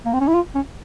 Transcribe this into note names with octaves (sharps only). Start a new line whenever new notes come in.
A#3
C4
C#4
E4
F4
C#4